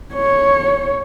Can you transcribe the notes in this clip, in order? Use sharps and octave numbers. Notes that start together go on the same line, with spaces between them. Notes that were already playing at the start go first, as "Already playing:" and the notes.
C#5